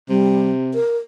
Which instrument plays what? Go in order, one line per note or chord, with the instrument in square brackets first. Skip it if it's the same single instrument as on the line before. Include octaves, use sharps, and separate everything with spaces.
[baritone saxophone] C3 [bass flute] G3
[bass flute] A#4